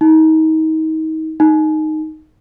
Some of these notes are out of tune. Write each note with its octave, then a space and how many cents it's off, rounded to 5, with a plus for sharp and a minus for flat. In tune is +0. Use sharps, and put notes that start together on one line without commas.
D#4 +30
D#4 -5